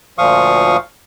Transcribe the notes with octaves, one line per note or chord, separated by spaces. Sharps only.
D2 A#2 F3 F5 C#6 D#6